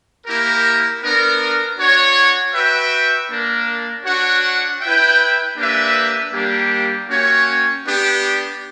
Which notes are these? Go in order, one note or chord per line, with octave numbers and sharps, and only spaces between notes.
A#3 E4 G4 A#4
B3 D4 A#4
D4 F#4 C#5 F#5
F#4 B4 E5 G5
A#3 D4 A#4
D4 F#4 C#5 F#5
E4 B4 E5 G5
A#3 D4 G4 B4 E5
G3 A#3 D4 G4
A#3 C#4 F#4 C#5 G5
B3 D4 G4